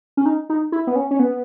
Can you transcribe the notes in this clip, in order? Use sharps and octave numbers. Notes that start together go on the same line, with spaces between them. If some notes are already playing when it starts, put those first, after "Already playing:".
C#4
D#4
D#4
E4
B3
C#4
C#4
B3